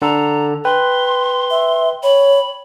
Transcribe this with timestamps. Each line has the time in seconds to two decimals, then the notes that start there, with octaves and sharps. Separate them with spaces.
0.02 D3 A4 A#5
0.65 B4 G5 C6
1.51 E5
2.03 C#5 B5